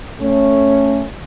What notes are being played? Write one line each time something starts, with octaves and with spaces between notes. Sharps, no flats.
A3 C#4